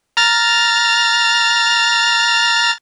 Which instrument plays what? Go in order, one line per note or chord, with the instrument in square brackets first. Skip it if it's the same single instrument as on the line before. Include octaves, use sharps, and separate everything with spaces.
[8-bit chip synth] A#5 F6 A6